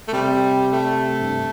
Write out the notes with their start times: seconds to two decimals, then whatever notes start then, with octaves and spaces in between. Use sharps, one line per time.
0.08 A3
0.13 C3 G3
0.71 A3
1.21 G2